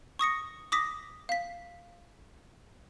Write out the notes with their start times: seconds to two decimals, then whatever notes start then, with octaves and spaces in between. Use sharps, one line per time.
0.19 C#6 D#6 A#6 C#7
0.72 D6 D#6 A#6 B6
1.29 F5 B6